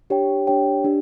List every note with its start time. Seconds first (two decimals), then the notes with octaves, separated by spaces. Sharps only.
0.10 D4 G4 C#5 G5
0.47 D4 G4 C#5 G5
0.84 D4 G4